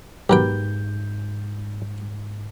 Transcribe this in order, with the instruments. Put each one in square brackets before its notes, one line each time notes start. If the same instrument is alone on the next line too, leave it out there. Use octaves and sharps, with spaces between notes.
[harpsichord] B1 F#3 G5 [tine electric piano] G#2 G6 [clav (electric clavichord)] G4 A#4 B4